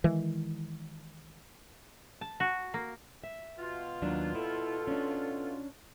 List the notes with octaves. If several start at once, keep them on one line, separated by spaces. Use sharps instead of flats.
D#3 E3 G#3
A5
F#4
A#3
E5
B2 F4
D#2 F#3 D4
E4 A4
C#4 D4